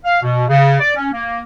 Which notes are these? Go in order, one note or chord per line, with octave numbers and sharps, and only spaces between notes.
F5
B2
C#3
D5
C#4
A#3